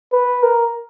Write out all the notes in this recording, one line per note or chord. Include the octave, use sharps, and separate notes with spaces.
B4
A#4